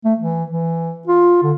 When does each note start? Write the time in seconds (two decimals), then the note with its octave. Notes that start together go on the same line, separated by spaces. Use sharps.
0.05 A3
0.19 E3
0.50 E3
1.07 F4
1.43 D3